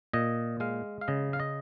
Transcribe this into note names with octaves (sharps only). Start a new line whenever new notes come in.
A#2 D#5
G#3 F5
F5
C#3 D#5
F5
D#5